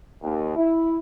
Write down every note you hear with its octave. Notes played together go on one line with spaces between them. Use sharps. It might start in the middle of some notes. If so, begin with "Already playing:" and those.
D#2
E4